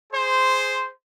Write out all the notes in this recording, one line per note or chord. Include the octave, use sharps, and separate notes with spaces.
G#4 C5